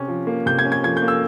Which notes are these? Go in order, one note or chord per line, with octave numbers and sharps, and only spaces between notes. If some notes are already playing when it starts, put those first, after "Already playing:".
Already playing: C3 C#4
F3
A#3
C3 G6
G#6
C#4
G#6
F3 G#6
G6
A#3
E6